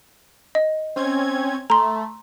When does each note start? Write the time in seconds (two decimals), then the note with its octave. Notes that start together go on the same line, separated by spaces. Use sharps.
0.55 D#5
0.96 C4 C#4 G#6
1.70 A3 A#5 C6